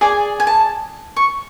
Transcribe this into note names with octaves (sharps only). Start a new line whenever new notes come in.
G#4 D5 G#5
G#5
A5
C#6